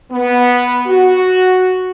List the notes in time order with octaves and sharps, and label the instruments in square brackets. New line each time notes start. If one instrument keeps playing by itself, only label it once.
[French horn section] B3
F#4